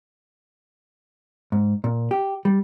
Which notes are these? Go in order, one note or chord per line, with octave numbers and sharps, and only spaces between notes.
G#2
A#2
G4
G3